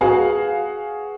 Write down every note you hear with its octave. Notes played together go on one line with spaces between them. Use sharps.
F#4 G#4 B4 F5 F#5 G#5